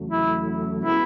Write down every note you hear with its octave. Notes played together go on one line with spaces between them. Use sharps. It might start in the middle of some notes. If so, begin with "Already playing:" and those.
Already playing: E2 C#3 F#3 A3
E4
C#3 G#3 B3 E4 F#4